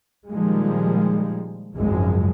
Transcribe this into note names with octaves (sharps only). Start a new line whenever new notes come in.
A#2 D#3 F3 G3 G#3
G#1 C#2 F#2 F3 G#3